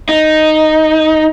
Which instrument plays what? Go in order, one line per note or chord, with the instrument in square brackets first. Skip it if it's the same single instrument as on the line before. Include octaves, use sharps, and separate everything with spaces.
[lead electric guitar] D#4